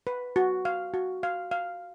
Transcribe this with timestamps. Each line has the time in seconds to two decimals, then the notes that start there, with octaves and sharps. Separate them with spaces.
0.07 B4
0.36 F#4
0.65 F5
0.94 F#4
1.23 F5
1.51 F5